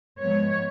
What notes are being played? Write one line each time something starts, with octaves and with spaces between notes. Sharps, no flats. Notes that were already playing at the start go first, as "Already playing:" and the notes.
G#2 F3 G#3 B3 C#5